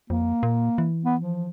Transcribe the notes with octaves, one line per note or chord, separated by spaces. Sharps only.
F2 A#3
A#2
E3
B3
F3